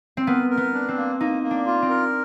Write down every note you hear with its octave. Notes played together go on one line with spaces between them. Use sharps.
C4
B3 A#4
A#4
B3
D4
C4
A#3
A#3 D#4
A#3
D4
F4
C4
A#4